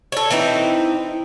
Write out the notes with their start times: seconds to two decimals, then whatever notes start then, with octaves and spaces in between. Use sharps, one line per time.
0.12 A4 C#5
0.30 E3 C4 D#4 E4